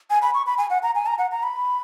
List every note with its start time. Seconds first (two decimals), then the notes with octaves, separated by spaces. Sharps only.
0.10 G#5
0.22 B5
0.34 C#6
0.46 B5
0.58 G#5
0.70 F#5
0.83 A#5
0.95 G#5
1.06 A#5
1.18 F#5
1.31 A#5
1.43 B5